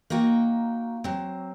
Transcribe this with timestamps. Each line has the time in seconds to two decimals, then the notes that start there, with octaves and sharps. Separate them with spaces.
0.10 A#3 D#4 F#4 G5
1.04 F#3 C4